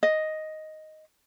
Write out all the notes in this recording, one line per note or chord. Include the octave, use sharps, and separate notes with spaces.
D#5